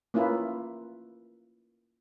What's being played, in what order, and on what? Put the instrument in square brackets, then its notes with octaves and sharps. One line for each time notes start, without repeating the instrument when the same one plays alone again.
[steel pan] A#3 C#4 E4 F4 B4